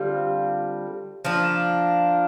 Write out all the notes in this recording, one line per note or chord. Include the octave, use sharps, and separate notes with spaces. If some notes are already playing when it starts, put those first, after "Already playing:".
Already playing: D3 G3 C4 F4
F3 A#3 D4